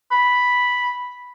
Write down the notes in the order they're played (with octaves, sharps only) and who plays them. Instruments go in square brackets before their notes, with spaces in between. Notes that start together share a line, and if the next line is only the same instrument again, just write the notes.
[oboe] B5